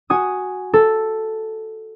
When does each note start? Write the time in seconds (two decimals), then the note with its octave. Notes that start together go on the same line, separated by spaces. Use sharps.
0.10 F#4 G#5 D#6
0.74 A4